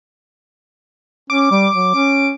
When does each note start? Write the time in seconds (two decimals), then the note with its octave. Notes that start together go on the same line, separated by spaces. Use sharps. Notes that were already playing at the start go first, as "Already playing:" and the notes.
1.30 C#4 D6
1.51 G3
1.75 F#3
1.95 C#4